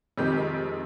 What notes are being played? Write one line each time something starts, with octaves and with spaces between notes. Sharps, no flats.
F2 C3 D#3 G#3 G4